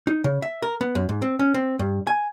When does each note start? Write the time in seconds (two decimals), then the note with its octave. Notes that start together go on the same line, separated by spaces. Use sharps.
0.07 D#4
0.24 C#3
0.42 E5
0.62 A#4
0.81 B3
0.95 F#2
1.09 G#2
1.22 C4
1.39 C#4
1.54 C4
1.79 G2
2.07 G#5